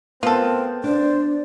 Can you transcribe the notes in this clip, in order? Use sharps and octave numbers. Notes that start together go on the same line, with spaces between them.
B3 C4 F4 A4 A#4
D4 C5 D5